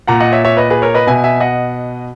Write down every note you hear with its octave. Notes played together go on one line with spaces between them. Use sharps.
A#2 F#5 A#5
D#5 F#5
C#5 E5
C#5 E5
B4 D#5
G#4 B4
A#4 C#5
B4 D#5
B2 E5 G#5
E5 G#5
D#5 F#5